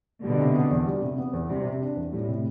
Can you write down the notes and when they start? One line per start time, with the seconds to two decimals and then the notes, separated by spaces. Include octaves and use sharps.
0.24 B2 D3 G3
0.39 C3
0.55 B3
0.71 E2
0.86 G3
1.02 C3
1.18 B3
1.33 E2
1.50 C3 G3
1.65 C3
1.81 D4
1.97 E2
2.12 A2 G3
2.28 C3